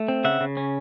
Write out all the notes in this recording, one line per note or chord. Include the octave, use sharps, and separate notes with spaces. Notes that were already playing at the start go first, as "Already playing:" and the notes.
Already playing: A3
C4
C#3 E5 F#5
C#3
C#4